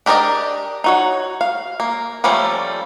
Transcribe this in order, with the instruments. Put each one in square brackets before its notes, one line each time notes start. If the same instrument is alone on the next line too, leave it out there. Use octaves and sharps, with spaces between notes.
[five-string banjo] D4 G4 A#4 D5 D#5
D#4 F#4 C#5
F5
A#3
F3 G3 A3 A#3 C#4